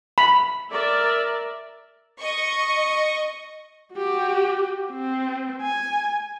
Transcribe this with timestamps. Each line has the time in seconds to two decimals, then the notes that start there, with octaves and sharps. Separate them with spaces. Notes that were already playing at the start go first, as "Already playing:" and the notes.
0.18 B5
0.70 A#4 D5 E5
2.19 D#5 C#6
3.95 F#4 G4
4.91 C4
5.62 G#5